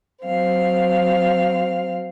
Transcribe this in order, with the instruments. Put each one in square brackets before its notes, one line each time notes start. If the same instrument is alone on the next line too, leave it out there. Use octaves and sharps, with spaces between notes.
[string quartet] F#3 C4 F5